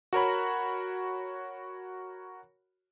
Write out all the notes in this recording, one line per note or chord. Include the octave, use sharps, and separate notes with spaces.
F#4 A#4 C#5 B5